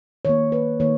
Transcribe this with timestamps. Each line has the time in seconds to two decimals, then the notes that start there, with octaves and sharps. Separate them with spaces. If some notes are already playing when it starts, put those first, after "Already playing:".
0.25 D#3 A#3 C#5
0.52 B4
0.80 D#3 A#3 C#5